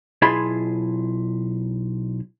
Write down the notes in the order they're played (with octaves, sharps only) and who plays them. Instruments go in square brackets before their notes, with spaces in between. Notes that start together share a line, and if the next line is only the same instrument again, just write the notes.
[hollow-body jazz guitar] B1 E4 F4 G#4 B5 C6